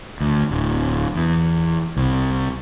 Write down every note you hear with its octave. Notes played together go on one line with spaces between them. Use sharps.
D2
D1
E2
C2